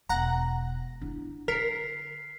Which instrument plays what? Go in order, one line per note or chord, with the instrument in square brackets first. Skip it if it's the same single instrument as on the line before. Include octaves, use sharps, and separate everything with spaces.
[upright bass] E1 [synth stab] F#5 A#5
[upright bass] D4 E4
[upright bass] D3 [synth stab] A#4 [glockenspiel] F6 B6 C7